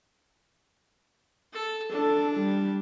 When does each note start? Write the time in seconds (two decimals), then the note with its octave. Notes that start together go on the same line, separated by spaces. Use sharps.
1.53 A4
1.92 D4 A4
2.36 G3